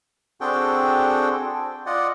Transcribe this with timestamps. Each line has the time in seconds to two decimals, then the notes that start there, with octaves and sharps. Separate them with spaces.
0.41 C4 D4 F#4 G#4 A4 G5
1.86 F4 D5 D#5 F#5